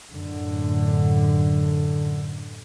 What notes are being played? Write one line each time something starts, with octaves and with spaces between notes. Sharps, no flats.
F#2 A2 D3